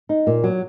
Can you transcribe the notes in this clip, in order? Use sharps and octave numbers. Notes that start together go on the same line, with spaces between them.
D#4
A#2
F#3